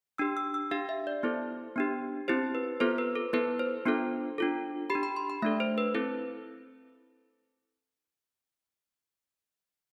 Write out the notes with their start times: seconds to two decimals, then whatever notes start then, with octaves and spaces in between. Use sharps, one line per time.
0.18 D4 G4 E6
0.37 E6
0.54 E6
0.71 D4 G4 F5
0.89 E5
1.07 D5
1.23 B3 E4 A4 C5
1.76 B3 D4 G4
2.28 C4 E4 G4 C5
2.55 B4
2.80 B3 F4 A4 C5
2.98 B4
3.15 A4
3.33 B3 E4 A4 B4
3.59 C5
3.86 B3 D4 F4 A4
4.38 D4 F4 A4
4.90 G4 B5
4.95 D4
5.03 B5
5.16 C6
5.30 B5
5.42 A3 D4 A4 E5
5.60 C5
5.78 B4
5.94 C4 E4 A4 B4